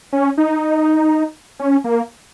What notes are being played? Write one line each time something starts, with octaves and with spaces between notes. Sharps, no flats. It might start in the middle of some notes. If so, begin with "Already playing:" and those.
C#4
D#4
C#4
A#3